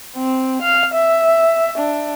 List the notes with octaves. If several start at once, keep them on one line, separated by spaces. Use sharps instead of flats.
C4
F5
E5
D4